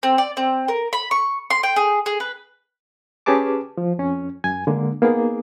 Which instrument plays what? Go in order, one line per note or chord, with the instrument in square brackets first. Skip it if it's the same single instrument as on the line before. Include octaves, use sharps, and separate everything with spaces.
[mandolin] C4
D5
C4
A#4
B5
C#6
C6
G5
G#4
G#4
B4
[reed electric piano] C#4 G4 G#4 B4 A5 D6
F3
F2 C#4
F#2 G#5 G#6
D3 G#3 A#3
A#3 B3 D#4 G#4